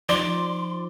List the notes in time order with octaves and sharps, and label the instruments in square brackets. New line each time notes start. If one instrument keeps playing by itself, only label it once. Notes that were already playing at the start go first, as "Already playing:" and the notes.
[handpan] F3 D#4 [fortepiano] D5 [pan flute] C6